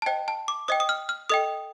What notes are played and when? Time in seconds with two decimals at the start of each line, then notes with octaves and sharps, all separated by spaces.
0.02 A5
0.06 C5 D#5 G5
0.28 A5
0.48 D6
0.68 C5 D#5 G5 D#6
0.80 D#6
0.89 F6
1.09 F6
1.29 A4 D#5 G5 D#6